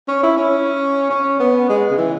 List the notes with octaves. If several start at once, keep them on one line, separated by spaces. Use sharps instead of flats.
C#4
E4
C#4
C#4
B3
G#3
C#3
E3